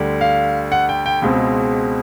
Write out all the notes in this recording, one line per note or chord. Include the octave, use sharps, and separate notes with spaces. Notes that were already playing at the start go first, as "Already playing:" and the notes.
Already playing: D2 D3 G3
F5
F#5
G5
G5
C#2 B2 G#3 C4